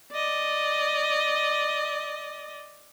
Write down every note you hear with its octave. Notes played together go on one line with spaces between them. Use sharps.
D5 D#5